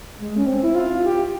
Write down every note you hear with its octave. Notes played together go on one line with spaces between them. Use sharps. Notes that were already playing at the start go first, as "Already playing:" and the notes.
G#3
C#4
C4
E4
F4
G4